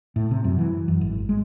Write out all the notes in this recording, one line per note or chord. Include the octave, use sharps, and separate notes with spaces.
A2
C3
F#2
E3
F#2
G#1
G#3